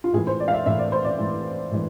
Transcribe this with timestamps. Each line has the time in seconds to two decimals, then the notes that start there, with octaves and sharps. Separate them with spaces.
0.04 F4
0.13 A2 G#4
0.17 E3
0.27 C5
0.40 D5
0.48 F5
0.53 E5
0.66 A2 E3 E5
0.79 D5
0.92 C5
1.04 D5
1.19 A2 E3
1.71 A2 E3